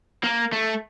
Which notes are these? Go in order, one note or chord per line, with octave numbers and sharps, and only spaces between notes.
A#3
A3